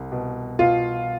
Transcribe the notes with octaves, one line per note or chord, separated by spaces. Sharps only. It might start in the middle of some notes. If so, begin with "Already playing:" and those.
Already playing: C2
B2
B2 F4